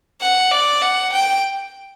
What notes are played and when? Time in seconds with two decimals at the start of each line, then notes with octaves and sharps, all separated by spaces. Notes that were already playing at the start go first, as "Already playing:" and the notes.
0.21 F#5
0.51 D5
0.81 F#5
1.12 G5